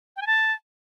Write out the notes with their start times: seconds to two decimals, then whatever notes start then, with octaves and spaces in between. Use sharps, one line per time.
0.16 G5
0.21 G#5
0.27 A5